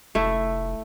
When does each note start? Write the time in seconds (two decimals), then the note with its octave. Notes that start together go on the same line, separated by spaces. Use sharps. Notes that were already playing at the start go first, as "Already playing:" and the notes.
0.15 F1 A3 E4